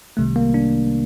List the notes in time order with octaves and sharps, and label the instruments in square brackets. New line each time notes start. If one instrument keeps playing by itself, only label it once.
[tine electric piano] C2 C3 D#3 G3 A3
A#3
D4